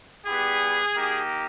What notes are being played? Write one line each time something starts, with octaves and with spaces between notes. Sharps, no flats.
G3 B3 E4 G4 G#4
A#3 D#4 G4